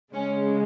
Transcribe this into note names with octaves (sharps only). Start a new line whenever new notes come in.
C#3 G#3 C#4